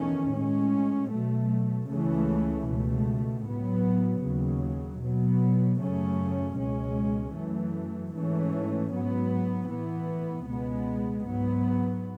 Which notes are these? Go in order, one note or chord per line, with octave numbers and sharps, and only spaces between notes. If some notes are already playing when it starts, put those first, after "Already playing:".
Already playing: E2 D#3 A3 C#4
A2 G#3 C#4
B2 F#3 A3
C#2 C#3 E3 A3 C#4
C#2 B2 A3
A2 F#3 B3
D#2 C#3 F#3
B2 F#3 B3
F#2 C#3 F#3 A3 C#4
C#2 B2 G#3 C#4
F#2 E3 A3
G#2 E3 A3 C#4
G#2 F#3 B3
A2 E3 B3
C#2 B2 G#3 B3
G#2 F#3 B3